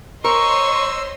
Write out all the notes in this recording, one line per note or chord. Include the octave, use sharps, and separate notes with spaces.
A#4 C5 C#5 D#5 C6 C#6 E6